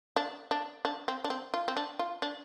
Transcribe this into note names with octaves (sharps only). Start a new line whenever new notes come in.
D4
D4
D4
C4
D4
C4
F4
C4
D4
F4
D4